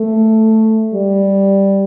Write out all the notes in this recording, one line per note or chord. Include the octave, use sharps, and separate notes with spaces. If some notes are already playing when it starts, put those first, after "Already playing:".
Already playing: A3
G3